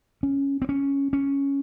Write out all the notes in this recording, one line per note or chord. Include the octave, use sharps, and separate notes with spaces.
C#4
C4
C#4
C#4